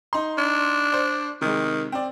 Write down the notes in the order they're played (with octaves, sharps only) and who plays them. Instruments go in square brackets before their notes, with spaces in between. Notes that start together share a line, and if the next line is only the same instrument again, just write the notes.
[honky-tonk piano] D#4 C6
[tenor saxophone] D4
[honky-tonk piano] C5 D5
[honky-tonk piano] C3 G#3 [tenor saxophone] D#3
[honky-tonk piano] C4 D5